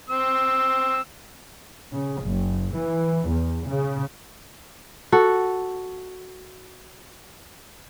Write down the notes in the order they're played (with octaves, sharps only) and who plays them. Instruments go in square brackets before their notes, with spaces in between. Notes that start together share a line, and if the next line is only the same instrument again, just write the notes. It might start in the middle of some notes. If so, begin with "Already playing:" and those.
[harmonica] C4 E6
[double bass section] C#3
F#1
E3
E2
C#3
[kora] F#4 A4